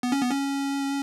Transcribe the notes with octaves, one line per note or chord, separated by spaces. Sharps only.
B3
C#4
B3
C#4